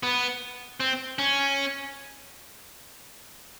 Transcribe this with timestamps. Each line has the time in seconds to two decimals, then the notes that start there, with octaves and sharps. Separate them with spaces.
0.03 B3
0.80 C4
1.19 C#4